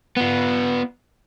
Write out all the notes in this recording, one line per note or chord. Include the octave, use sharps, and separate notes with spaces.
B3 F4